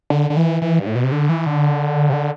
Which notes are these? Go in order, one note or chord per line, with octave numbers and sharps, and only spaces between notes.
D3
D3
E3
E3
G2
A2
B2
C3
D3
E3
D3
C3
D3